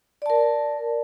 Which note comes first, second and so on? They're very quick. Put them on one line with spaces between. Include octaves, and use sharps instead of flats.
D5 A5 A#4